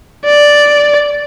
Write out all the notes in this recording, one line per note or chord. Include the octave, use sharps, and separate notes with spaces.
D5